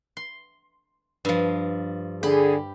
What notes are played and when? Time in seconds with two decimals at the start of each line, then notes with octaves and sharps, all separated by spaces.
0.17 C6
1.25 G2 F3
2.23 D3 G4 G#4 B5